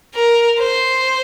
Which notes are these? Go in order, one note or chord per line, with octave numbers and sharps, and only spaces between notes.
A#4
C5